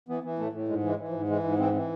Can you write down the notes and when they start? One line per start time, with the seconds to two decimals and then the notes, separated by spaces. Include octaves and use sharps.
0.09 E3 B3
0.23 E3
0.39 A2 A3
0.53 A2
0.68 G#2 G#3
0.83 E3
0.89 G#3
0.99 E3
1.08 F3
1.14 G#2
1.29 E3 G#3
1.44 G#2
1.59 E3 C4
1.74 E3